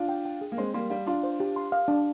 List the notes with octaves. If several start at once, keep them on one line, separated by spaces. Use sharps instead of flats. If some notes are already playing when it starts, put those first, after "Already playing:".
Already playing: D4 F4
G5
G5
G#4
A#3
G#3 C4 C6
G3 A#3 C6
G3 F5
D4 F4 C6
C5
G4
C6
F5
D4